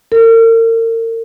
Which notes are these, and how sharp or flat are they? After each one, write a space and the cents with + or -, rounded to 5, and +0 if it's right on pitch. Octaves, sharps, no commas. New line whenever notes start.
A#4 -40